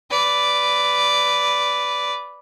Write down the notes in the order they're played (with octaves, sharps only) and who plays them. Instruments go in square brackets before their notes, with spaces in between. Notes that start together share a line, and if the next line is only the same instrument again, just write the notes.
[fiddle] B4 D5